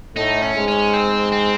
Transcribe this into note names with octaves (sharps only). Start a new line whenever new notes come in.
A2 A3 D#4
C#4
G#2 G#3
C#4
C4
C4